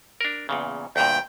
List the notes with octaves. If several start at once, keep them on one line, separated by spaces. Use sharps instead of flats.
D4 A#4
E2 A#2 C#3
D2 G2 A#2 G5